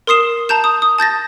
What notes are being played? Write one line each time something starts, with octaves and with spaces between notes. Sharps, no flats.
A#4 C6 D#6 C7 E7
A5 A#5 G6 E7
D#6
D#6
A5 G6 A6 A#6